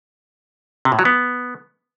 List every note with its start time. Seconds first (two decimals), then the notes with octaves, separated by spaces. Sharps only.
0.85 C3
0.92 A2
0.99 F#3
1.05 B3